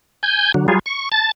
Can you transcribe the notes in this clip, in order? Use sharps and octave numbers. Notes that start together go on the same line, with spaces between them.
G#5 G6
D3 F#3
F#3 G3 F4 G#4
C#6
A5 A6